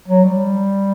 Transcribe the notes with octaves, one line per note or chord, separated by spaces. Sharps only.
F#3
G3